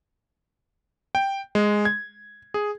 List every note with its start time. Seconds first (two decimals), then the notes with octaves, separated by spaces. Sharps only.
1.15 G5
1.55 G#3
1.85 G#6
2.54 G#4